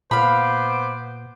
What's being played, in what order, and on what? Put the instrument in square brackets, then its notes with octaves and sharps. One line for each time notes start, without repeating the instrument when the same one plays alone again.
[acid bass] A#2 [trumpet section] B3 C5 D6 [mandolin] F5 B5